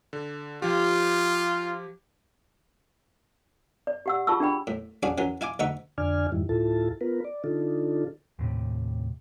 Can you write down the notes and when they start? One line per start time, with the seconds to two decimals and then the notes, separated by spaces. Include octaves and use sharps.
0.13 D3
0.62 F3 F4 G4
3.87 D5
4.06 G4 F#5 E6
4.27 F4 G#4 A5 C#6 E6
4.40 D4 G#4 G5 B5
4.67 A2
5.03 C#4 D4 F#4 G#4 F5
5.18 F#2 E3 F#3 C#4
5.41 E4 F5 G#5 D6
5.59 D2 D#4 E5 F#5 C#6
5.98 F2 D3 D4 D5 G#5 F6
6.32 F2 G#2 D#3 G3 E4
6.49 D2 A2 E4 F4 A4 A5
7.01 B3 F4 A#4 B4
7.25 D5
7.44 D3 D4 D#4 F4 A4
8.39 D#2 A2 C3